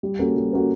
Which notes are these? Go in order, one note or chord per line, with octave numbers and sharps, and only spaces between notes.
G3
A#3 C#4 F#4 A4
G3
A#3 C#4 F#4 A4